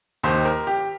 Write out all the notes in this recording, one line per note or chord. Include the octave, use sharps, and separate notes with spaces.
D#2 D#3 C5
A#4
G4